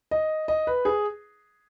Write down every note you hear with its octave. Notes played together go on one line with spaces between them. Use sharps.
D#5
D#5
B4
G#4